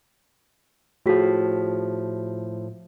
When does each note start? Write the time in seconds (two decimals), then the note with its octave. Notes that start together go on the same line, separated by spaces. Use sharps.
1.06 A2 F3 F#4 G#4 B6